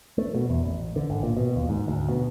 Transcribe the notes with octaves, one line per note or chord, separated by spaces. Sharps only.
A3
B2
E2
A1
D3
G#1
A#2
B2
D#2
G#2
D2
B2